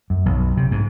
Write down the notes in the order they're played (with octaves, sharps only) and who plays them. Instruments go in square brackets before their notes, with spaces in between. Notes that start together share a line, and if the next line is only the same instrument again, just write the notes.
[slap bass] F#2
B1
C3
G#2